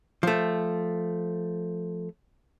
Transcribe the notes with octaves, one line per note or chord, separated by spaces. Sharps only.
F3 A3